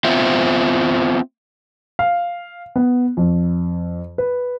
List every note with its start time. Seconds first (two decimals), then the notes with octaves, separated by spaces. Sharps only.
0.04 B3 C4 F4 C5 E5
1.99 F5
2.76 B3
3.17 F2
4.18 B4